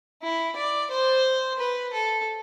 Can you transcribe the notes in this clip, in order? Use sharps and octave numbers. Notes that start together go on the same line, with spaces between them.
E4
D5
C5
B4
A4